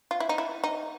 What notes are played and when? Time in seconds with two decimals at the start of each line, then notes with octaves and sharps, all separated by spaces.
0.11 F4
0.20 E4
0.29 D#4
0.38 E4
0.64 D#4